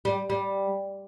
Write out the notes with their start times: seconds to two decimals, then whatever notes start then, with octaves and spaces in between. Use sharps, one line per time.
0.05 G3
0.30 G3